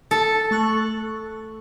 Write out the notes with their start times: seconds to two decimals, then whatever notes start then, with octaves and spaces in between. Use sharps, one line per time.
0.11 A4
0.51 A3 C#6 F#6